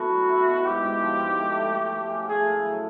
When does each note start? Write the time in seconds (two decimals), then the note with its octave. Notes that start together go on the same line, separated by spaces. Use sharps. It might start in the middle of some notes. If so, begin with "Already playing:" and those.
Already playing: A3 B3 E4 F#4 A4
0.11 F#3
0.29 E4
0.47 B2
0.65 G#2 G4
0.84 G#2
1.02 F3
1.21 G#2
1.39 A3
1.57 A3
1.75 A3
1.92 A3
2.11 C#4
2.29 A3 G#4
2.46 A2
2.65 F#3